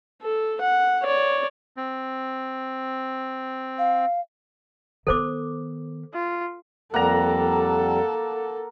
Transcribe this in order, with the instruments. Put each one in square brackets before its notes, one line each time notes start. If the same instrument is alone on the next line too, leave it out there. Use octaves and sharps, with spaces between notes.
[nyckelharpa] A4
F#5
C#5 D5
[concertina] C4
[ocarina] F5
[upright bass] D#3 B3 [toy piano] A4 C5 D6
[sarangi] F4
[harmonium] F2 G3 [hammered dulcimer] A#3 [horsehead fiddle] A4 [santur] F#5 A#5